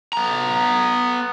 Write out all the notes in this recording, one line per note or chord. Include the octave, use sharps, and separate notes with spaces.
B3 A#5